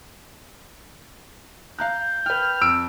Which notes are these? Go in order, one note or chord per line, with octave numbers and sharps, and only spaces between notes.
F5 A#5 F#6 G6
B4 G5 F6
F2 E6 D7